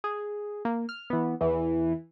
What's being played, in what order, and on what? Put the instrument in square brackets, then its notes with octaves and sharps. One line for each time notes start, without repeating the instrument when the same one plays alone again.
[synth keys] G#4
A#3
F6
E3 B3
[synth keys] E2 [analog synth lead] E3